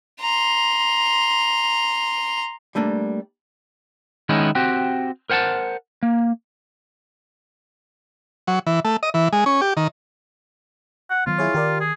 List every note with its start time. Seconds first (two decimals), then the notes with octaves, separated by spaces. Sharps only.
0.21 A#5 C6
2.75 G3 A3 A#3 D4
4.29 D#3 G#3 B3 C#4 D#4 E4
4.55 C4 F#4 G4
5.30 A#4 C5 F#5 G5 A5
6.03 A#3
8.48 F#3
8.67 E3
8.85 A3
9.03 D#5
9.14 E3
9.33 G#3
9.46 C#4
9.61 G4
9.77 D#3
11.10 F#5
11.27 D#3 F#3 B3 F4
11.38 E4 G#4 C#5
11.54 D#3 G4 A#4 D5
11.81 G#4